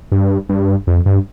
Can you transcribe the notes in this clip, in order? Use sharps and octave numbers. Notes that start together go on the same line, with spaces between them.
G2
G2
F2
G2